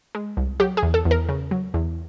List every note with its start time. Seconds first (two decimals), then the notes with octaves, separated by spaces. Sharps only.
0.15 G#3
0.37 C2
0.60 F#3 G4
0.77 G#4
0.83 E2
0.94 A4
1.05 E2
1.11 A#4
1.29 C#3
1.51 F#3
1.74 E2